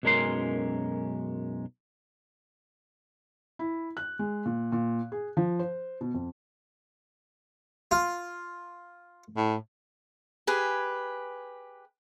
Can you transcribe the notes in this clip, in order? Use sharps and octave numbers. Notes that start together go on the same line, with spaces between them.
B1 F#2 G#3 C#4 A#4 C6
E4
F#6
G#3
A#2
A#2
G#4
F3
C5
B2
F2
F4
A2
G4 G#4 B4 G#5